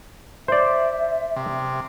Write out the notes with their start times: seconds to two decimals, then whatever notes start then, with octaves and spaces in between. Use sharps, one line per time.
0.48 C5 D5 E5
1.36 C3